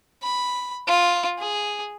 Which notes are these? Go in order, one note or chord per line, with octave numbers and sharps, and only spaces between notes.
B5
F4
G#4